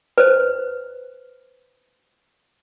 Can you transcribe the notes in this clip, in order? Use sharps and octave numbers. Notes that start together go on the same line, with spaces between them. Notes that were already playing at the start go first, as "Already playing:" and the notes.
B4 C5